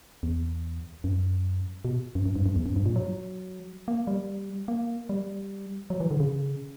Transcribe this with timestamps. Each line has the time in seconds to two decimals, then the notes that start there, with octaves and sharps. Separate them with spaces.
0.23 E2
1.04 F#2
1.85 B2
2.15 F#2
2.26 F#2
2.36 G2
2.46 F#2
2.56 E2
2.66 F#2
2.76 G2
2.86 A#2
2.96 F#3
3.88 A#3
4.07 G3
4.68 A#3
5.09 G3
5.90 F#3
6.00 E3
6.11 D3
6.20 C#3